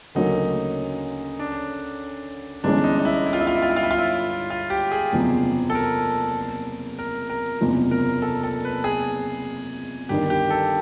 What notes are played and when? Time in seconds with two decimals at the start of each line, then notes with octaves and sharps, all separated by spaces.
0.15 D2 C#3 F#3 A#3 C#4 D#4
1.39 D4
2.64 G1 G2 E3 G#3 C#4 D4
2.84 D#4
2.99 D#4
3.05 E4
3.26 E4
3.33 F4
3.40 E4
3.47 F4
3.55 E4
3.62 F4
3.70 E4
3.76 F4
3.83 E4
3.91 F4
3.98 E4
4.50 F4
4.70 G4
4.91 G#4
5.12 F#1 E2 C3 F3
5.70 A4
5.75 A#4
6.99 A#4
7.29 A#4
7.61 F#1 E2 C3 F3
7.91 A#4
8.22 A4
8.43 A4
8.65 B4
8.84 G#4
10.09 G1 G2 D#3 G4
10.30 G4
10.50 A4